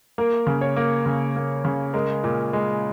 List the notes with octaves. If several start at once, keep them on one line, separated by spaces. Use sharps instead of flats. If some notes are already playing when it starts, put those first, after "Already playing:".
A#3 A#4
C#3
C#5
A#3
C#3
A#3
C#3
G#3 A#4
A#2
G#3